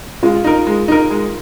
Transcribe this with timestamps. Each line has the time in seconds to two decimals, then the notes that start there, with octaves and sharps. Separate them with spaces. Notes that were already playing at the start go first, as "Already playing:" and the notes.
0.23 G#3 F4
0.44 D#4 A#4
0.67 G#3
0.88 D#4 A#4
1.10 G#3